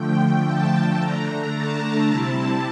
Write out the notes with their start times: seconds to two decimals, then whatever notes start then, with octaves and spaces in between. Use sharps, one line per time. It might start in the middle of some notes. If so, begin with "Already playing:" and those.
Already playing: D3 F3 A3 G5
0.46 A5
1.00 D3 A3 D4 A#5
1.54 A5
2.08 C3 G3 C4 E4